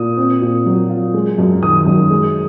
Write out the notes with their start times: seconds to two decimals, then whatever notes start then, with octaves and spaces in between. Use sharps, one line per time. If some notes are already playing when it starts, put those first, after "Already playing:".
Already playing: A#2 D#6
0.17 C4
0.41 A#2
0.66 F#3
0.90 F4
1.14 G#3
1.38 F#2
1.63 D#3 D#6
1.86 F#2
2.10 G#3